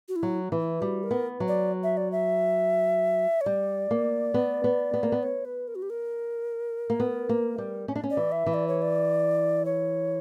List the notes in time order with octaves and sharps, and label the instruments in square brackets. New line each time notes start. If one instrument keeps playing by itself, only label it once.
[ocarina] F#4
E4
[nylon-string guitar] F#3
E3
[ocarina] E4
[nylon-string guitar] G3 [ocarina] F#4
[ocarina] A#4
[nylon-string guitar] B3
F#3
[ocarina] D5
E5
D5
E5
C#5
[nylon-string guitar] G3 [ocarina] D5
[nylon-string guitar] A#3
B3
B3
B3
A#3
B3
[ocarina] C#5
B4
A#4
F#4
G4
A#4
[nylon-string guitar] A#3
B3
A#3
G3
C#4
D4
C#4
[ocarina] D5
[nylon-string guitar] E3
[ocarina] E5
[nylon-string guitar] E3
[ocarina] D5
C#5
D5
C#5